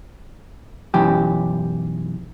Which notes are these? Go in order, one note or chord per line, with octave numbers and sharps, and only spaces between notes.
B1 F#2 E3 G4